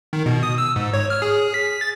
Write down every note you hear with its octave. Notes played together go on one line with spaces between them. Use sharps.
D#3
B2
D#6
E6
G#2
C#5
F6
G#4
G#4
B6
A6